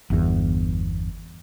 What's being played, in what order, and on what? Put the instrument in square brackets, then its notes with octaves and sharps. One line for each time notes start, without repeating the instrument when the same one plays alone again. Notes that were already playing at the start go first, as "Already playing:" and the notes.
[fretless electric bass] G1 E2